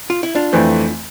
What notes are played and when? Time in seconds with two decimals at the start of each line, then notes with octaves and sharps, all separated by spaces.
0.10 F4
0.23 E4
0.35 D4 F4
0.53 F2 E3 A3 C4